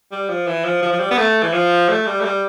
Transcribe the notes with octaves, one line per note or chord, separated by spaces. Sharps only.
G3
F3
E3
F3
F3
F3
G3
B3
A3
E3
F3
A3
G3
A3
G3